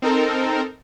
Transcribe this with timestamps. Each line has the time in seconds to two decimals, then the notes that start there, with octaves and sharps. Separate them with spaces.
0.02 C4 D#4 A4 A#4